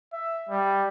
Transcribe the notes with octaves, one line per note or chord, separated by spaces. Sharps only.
E5
G3